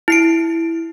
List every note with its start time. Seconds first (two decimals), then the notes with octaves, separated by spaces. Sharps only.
0.08 E4 C7 D7